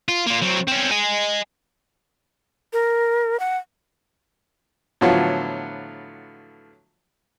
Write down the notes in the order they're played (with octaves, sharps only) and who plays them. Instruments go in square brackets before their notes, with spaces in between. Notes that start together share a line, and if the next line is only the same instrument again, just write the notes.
[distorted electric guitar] F4
A#3 F4
F#3 C4
C4 C#4
D#5 G#5
[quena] A#4
F#5
[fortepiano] A2 D3 F3 F#3 B3 F4